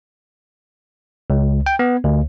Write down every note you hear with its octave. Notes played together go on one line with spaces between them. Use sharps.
C#2
G5
B3
D2